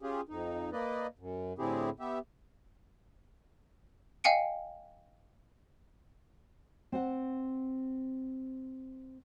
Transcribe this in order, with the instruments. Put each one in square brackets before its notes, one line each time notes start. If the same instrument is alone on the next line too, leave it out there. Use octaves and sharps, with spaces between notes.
[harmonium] C#4 F4 G4 G#4
F2 D#4
A#3 B4 D5 D#5
F#2
A2 D3 C4 E4 G4 G#4
B3 G4 E5
[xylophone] D#5 F5 G5 G#5 C#7 D7
[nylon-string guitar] C4 C5 F#5